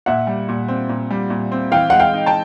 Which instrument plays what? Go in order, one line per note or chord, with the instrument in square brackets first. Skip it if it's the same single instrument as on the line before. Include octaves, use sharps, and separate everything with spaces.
[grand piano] A#2 [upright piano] E5 F#5
[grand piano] G3
A#2
C4
A#2
G3
A#2
C4
[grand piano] E3 [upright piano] F5 G5
[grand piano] G#3 [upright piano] F#5
[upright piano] F5 G5
[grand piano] D#4
[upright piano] G5 A5